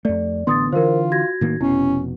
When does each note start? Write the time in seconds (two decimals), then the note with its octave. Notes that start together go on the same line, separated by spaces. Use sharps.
0.05 F2 A3 D5
0.47 A1 D3 B3 C6 D#6 A6
0.72 D3 E3 F4 A#4 C5
1.12 F#4 G#6 A#6
1.41 A2 D#3 A#3
1.61 F1 B2 C#4 E4